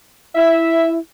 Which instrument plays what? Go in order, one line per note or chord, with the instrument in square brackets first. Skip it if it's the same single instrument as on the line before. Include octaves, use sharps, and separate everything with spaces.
[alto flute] E4 [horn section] E5